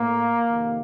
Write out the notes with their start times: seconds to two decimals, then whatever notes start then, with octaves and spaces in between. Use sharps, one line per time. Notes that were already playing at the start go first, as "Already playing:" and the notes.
Already playing: A2 A#3
0.50 F2 C3 D#3